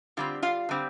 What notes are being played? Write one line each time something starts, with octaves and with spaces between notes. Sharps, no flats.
D3 G3 C4 F4
F4 F5
D3 G3 C4